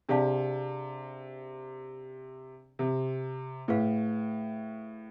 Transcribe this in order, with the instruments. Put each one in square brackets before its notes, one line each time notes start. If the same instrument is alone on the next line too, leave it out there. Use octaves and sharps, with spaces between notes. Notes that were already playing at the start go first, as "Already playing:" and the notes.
[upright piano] C3 [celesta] D4 G#4 D5 F5 A5
[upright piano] C3
[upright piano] A2 [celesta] G#4 B4 F5